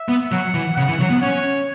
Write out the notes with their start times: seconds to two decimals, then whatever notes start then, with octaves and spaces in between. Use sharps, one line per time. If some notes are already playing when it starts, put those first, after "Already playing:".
Already playing: E5
0.08 B3
0.32 F#3 F#5
0.54 E3
0.76 C#3 F#5
0.88 E3
1.00 F#3
1.10 B3
1.22 C#4 C#5